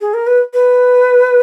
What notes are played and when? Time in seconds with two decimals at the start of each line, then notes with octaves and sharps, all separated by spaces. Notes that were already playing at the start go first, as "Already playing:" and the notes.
0.01 G#4
0.14 A#4
0.27 B4
0.54 B4